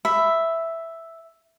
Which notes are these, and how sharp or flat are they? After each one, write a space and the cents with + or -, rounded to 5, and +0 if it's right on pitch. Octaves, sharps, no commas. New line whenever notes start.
E5 +0 B5 +10